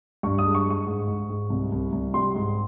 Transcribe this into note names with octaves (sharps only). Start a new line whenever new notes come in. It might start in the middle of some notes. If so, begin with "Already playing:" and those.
G2 C#6
D#6
G#3
C#6
G#3 C#6
G#2
G#2
G#2
C2
C2
C2
G3 C6
G#2